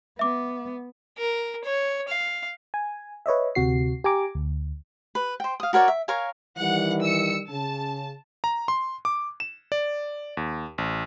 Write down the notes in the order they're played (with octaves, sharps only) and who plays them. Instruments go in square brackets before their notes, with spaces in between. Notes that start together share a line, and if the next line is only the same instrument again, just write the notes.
[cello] B3 [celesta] E5 D6
[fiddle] A#4
C#5
F5
[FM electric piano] G#5
B4 C#5 D#5 E5
D2 C3 F#4 C7
G4 G#5 A#5 D6
D2
[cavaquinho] B4
C5 G5
F5 D#6
F#4 A#4 C#5 D5
E5
A#4 C#5 F5 G#5
[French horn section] D#3 E3 G3 [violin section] F#5
[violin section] E6 C#7
[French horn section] C#3 [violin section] A5
[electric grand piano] A#5
C6
D6
E7
D5
D#2
A1